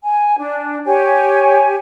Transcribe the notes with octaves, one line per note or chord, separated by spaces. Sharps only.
G#5
D4
G4 C#5 G#5